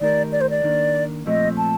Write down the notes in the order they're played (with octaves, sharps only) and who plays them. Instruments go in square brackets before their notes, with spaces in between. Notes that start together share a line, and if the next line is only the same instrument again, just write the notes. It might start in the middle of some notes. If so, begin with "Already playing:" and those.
[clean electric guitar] D#3 A3 D#4 G4 A#4 [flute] D5
[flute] D5
C5
D5
[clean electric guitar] D#3 A#3 D4
[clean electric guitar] A#2 F3 A3 C4 [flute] D#5
[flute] A5